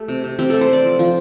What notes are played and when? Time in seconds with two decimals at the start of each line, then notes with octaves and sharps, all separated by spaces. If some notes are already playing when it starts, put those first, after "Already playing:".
Already playing: A3 G4
0.08 C3
0.24 C3
0.39 C4 G4
0.50 A3 A4
0.61 C5
0.69 A3 D5
0.84 F3
0.99 F3